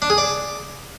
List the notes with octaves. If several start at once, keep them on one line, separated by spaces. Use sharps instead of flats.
D4
G#4
D5